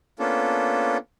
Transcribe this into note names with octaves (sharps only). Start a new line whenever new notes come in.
A#3 B3 C#4 D4 F4 A4